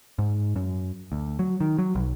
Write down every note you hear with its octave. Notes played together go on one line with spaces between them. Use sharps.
G#2
F#2
D2
F#3
D#3
F#3
B1